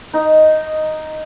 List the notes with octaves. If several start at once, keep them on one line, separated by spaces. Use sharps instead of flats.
D#4